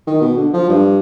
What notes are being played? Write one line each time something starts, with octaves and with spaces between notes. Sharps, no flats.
D#3
B2
D3
F3
G2